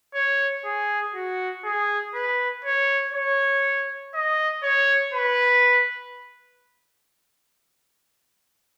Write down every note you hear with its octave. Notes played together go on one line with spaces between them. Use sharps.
C#5
G#4
F#4
G#4
B4
C#5
C#5
D#5
C#5
B4